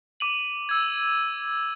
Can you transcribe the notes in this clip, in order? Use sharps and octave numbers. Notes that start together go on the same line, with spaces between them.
D6 D#7 F#7
E6 G#6